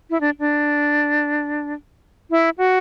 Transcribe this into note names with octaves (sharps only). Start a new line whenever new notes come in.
E4
D4
D4
E4
F#4